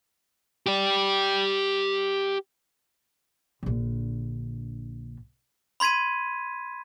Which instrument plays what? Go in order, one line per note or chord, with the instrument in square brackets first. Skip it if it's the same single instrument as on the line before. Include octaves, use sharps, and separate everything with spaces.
[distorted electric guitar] G4 D5
[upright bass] A#1 D3
[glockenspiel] B5 C6 G#6 B6 D#7